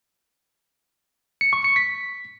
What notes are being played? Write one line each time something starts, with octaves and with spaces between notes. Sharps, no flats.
C#7
C#6
C#7
B6